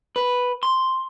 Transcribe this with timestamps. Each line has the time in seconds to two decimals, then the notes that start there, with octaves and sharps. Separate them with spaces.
0.16 B4
0.63 C6